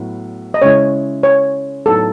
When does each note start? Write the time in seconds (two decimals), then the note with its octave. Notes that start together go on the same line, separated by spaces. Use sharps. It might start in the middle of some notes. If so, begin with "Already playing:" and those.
Already playing: A2 F#3 B3
0.54 D#5
0.62 C#3 G#3 C#4 E4 C#5
1.23 C#5
1.86 A2 F#3 B3 D#4 A4